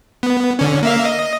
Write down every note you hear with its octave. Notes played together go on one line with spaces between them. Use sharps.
B3
D3 C#4
A#3 E5 F5
D#5